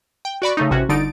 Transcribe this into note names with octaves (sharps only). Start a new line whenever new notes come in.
G5
F#4 D5 B5 C#6
C#3 A3 D#4
A1 C3 C#4 F#4
G1 D3 D#4 A6 D7